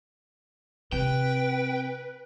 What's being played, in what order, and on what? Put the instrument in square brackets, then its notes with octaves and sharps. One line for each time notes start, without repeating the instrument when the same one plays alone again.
[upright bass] C3 [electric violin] B4 [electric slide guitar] G5